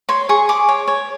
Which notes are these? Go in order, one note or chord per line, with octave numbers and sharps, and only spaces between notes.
C#5 C6
G#4 C#6
G#4 D6
C#5
C#5